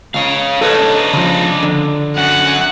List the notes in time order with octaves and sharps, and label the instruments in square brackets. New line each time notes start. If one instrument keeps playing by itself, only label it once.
[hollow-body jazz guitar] C#2 [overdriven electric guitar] C#5 F5
[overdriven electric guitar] D4 D#4 [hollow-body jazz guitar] A4 B4 C#5
[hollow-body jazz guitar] C#3 F3
D3
[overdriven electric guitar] F#2 F#4 [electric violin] F#5